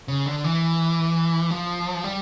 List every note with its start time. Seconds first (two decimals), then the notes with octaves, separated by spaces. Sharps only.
0.08 C#3
0.26 D3
0.44 E3
1.51 F3
2.04 G3